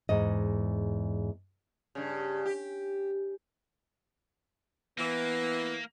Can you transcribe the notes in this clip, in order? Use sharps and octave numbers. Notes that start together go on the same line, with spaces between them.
E2 G#2 D#5
G2 C#3
G4
E3 A#3 B3